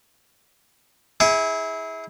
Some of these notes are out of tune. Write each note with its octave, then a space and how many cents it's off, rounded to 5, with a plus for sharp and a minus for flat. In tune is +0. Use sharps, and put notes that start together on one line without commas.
E4 -25 G#4 +0